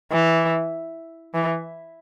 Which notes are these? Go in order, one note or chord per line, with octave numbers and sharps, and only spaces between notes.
E3
E3